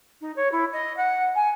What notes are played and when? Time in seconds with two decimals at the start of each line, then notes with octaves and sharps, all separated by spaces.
0.21 D#4
0.36 C#5
0.52 E4
0.72 D#5
0.96 F#5
1.35 G#5